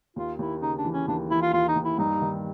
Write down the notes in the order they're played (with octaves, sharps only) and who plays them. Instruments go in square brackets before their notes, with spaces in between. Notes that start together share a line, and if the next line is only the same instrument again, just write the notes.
[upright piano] D#2 [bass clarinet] F4
[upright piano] D#2 [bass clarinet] E4
[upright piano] C#3 [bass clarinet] D#4
[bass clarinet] D4
[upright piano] E3
[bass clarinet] C#4
[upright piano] D#2 [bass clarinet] D4
[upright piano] E3 [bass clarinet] E4
[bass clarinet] F4
[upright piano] D#2 [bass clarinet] F4
[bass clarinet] D#4
[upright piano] D#2
[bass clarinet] E4
[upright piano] G2 [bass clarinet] D#4
[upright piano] D#3